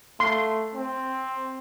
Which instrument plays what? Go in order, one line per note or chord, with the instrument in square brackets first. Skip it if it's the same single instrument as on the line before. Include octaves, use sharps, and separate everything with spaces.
[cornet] A3 [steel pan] C6
[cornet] C4